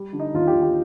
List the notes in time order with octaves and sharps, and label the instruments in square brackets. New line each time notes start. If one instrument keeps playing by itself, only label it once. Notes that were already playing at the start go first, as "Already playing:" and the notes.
Already playing: [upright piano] G3
D3
D#4
D#2 F4
G4
D#2
G4